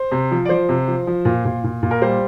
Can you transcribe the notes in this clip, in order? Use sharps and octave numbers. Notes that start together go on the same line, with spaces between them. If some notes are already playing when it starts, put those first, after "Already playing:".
Already playing: C5
C3
F3
D5
F3 C5
C3
F3
F3
A#2
A#2
A#2
A#2
A#4
G3 C5